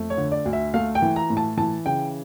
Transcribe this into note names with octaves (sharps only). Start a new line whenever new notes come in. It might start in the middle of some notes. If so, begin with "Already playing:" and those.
Already playing: F2 A3
C#5
D3
D5
D2
E5
A3 F5
G5
E3
A#5
A2
A5
E3 A5
C#3 G5